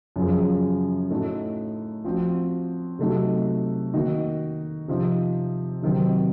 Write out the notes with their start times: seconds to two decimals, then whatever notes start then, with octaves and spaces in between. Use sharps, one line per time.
0.16 F#2 C#3 F3
1.10 A2 A3 D#4 F#4
2.04 F3 C4 F#4
2.99 C3 F#3 A3 D#4 F#4
3.94 D#3 A#3 D#4 F#4
4.88 C3 F3 C4 D#4
5.82 C3 D#3 F#3 C4